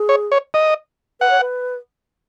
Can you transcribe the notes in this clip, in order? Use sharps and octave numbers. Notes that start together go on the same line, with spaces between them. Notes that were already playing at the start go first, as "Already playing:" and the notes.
Already playing: G#4
C#5
C#5
D#5
B4 F#5
C#5
B4